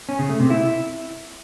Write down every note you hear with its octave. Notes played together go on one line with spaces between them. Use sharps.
C#4
C#3
A3
C3
E4